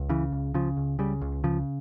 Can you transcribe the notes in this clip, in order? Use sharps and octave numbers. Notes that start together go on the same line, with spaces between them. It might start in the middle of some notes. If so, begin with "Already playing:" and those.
Already playing: C#2
C#3 E3
C#2
C#3 F3
C#2
C#3 G3
C#2
C#3 F3